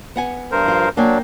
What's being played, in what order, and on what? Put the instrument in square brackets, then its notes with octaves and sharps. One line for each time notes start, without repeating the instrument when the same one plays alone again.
[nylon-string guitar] B3 F#5 G#5
[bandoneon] G2 A#4 C5
[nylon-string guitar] F3 F4
[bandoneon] F#3 D4 [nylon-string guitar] A#3 G5 G#5